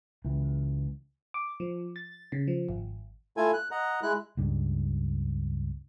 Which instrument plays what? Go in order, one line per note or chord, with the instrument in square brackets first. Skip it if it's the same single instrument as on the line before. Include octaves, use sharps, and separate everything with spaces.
[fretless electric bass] C#2 E3
[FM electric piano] D6
F3
A6
C#3
F3
G#1
[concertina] A3 E4 F4 A4 G#5
F#6
D#5 F#5 A#5
G#3 E4 F#6
[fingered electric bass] C#2 G2